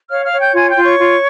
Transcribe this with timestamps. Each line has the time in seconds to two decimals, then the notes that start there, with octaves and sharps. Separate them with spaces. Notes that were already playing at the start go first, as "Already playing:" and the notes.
0.11 C#5 F5 F6
0.25 F5 F6
0.32 C#5
0.40 G5 G6
0.55 F4 G#5 G#6
0.69 G5 G6
0.76 F4
0.84 C#5 C#6
0.99 F4